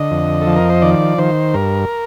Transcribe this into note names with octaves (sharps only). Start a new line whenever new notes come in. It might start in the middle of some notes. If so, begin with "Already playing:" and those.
Already playing: D3 D#5
F2
A4
F3
A#4
C5
D#3 D5
D#3 C5
G2 A#4